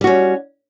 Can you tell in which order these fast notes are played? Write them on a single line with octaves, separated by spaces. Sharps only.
G3 F#4 C#4